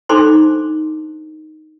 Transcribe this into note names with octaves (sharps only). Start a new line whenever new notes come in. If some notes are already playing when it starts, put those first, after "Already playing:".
D4 D#4 A4 C5 C6 D6